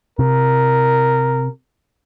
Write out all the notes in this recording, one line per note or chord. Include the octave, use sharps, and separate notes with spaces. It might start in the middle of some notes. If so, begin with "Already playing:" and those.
C3 A#4